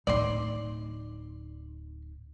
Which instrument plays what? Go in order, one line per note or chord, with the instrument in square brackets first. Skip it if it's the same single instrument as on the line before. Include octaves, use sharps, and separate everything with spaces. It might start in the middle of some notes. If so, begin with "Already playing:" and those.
[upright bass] D1 D#4 [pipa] D5 C6